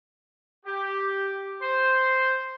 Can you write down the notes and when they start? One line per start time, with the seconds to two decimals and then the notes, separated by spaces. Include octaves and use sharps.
0.66 G4
1.61 C5